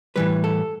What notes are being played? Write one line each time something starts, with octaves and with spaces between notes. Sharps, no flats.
A2 E3 G3 B4
A4